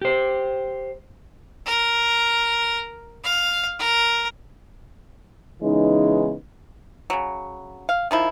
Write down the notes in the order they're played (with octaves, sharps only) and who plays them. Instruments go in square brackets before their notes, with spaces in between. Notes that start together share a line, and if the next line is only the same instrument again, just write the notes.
[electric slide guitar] G4 C5
[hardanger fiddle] A#4
F5
A#4
[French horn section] C#3 E3 G#3 B3 D#4
[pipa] C#3 F#3
F5
D#3 F3 E4